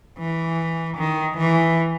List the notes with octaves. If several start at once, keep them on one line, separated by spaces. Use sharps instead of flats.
E3
D#3
E3